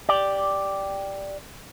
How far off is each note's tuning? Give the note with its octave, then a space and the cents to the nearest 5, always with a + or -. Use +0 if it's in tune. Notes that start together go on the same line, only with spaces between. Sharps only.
G4 +0 D5 +0